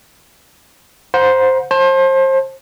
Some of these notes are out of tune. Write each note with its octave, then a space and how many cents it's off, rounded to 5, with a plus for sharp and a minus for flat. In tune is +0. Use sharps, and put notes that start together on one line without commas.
C5 +0 F#5 -35 A#5 +35
C5 +30 A5 +0